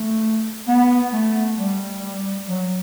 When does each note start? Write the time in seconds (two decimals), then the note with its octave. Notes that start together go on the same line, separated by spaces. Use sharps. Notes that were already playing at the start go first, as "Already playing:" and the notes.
Already playing: A3
0.68 B3
1.13 A3
1.59 G3
2.49 F#3